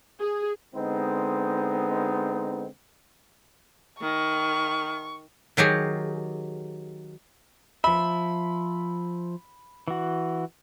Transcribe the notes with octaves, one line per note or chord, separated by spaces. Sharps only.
G#4
D3 G#3 B3 C4 D#4
D#3 C#6
D#3 F#3 G4 G#4
F3 E5 B5
E3 F#4